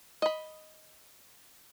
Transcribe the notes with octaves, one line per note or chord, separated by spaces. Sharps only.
D#5 B5